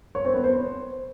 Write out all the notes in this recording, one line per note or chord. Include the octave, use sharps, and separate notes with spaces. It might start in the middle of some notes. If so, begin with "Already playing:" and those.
C#5
C4
B3
C5